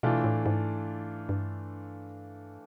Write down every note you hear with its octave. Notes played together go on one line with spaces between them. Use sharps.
B2 E3 A3 D4 F4
A2
G#2
G2